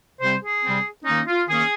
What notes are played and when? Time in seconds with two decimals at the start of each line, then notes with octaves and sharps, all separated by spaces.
0.20 C3 G3 C4 C5
0.42 G#4
0.63 C3 G3 C4
1.05 D#3 A#3 C#4 D#4
1.27 F4
1.47 D#3 A#3 C#4 G#4